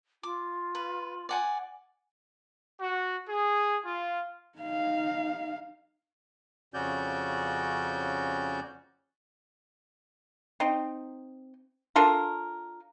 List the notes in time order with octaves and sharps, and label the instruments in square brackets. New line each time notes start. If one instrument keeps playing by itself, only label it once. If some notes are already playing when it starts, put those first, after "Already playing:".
[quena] F4 [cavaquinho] D6
[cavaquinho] B4
D5 F#5 G#5
[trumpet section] F#4
G#4
F4
[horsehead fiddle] D#4 F5
[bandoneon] F2 C#3 C#4 F#4 D5 G6
[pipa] C4 D#4
D4 F4 A4 A#4